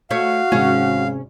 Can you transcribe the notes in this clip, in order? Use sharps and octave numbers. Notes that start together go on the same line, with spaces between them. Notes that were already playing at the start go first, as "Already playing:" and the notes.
A3 F#4 C#5 F5
G#1 C3 C#4 G#4